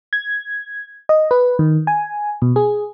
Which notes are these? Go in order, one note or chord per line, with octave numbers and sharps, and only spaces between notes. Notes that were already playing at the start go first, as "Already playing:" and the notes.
G#6
D#5
B4
D#3
G#5
B2
G#4